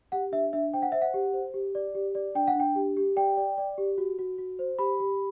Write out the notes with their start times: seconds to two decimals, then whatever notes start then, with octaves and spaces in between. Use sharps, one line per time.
0.12 G4 F#5
0.32 D4 E5
0.53 D4 E5
0.73 C5 G5
0.82 F#5
0.92 C5 E5
1.02 F#5
1.14 G4
1.34 C5
1.54 G4
1.75 D5
1.95 G4
2.15 D5
2.35 D4 G5
2.47 F#5
2.55 D4 G5
2.76 G4
2.97 G4
3.16 D5 G5
3.37 D5
3.58 D5
3.78 G4
3.98 F#4
4.19 F#4
4.38 F#4
4.59 C5
4.79 G4 B5
5.00 G4